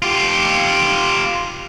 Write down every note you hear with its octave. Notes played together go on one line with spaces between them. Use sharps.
F4 G4